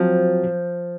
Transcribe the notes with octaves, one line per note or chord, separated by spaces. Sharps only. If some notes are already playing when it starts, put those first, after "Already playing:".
Already playing: F3 F#3 C4 F4